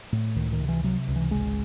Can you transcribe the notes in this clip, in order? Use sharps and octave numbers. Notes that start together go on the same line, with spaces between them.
A2
C#2 D#3
D#3
C3
E3
C3 F#3
C#2
E3
G#1 G#3